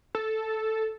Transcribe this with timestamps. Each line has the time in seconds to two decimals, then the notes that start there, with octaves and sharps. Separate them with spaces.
0.15 A4